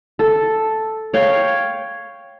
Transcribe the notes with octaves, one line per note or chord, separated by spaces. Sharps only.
A4
C#5 F5 G5